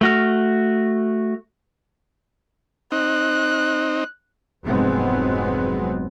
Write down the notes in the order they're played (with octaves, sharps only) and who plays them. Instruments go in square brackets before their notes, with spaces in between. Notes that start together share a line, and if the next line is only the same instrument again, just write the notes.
[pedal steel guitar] A3 F#4 F6
[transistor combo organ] C4 D#4 [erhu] F#6
[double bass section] F1 G#2 F#3 G#3 B3 C4